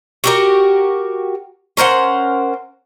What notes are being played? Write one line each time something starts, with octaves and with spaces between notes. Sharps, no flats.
F#4 G4 A#4
C#4 A#4 C5 F#5